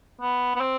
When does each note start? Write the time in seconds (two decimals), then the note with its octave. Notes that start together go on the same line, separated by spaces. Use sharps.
0.21 B3
0.56 B3
0.61 C4